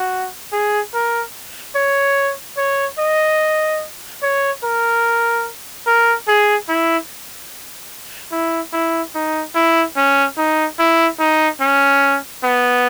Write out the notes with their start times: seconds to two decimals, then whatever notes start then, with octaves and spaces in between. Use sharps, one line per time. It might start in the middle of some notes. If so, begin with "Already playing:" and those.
Already playing: F#4
0.52 G#4
0.94 A#4
1.75 C#5
2.58 C#5
2.99 D#5
4.23 C#5
4.64 A#4
5.87 A#4
6.28 G#4
6.69 E4
8.32 E4
8.73 E4
9.15 D#4
9.55 E4
9.97 C#4
10.37 D#4
10.79 E4
11.20 D#4
11.61 C#4
12.44 B3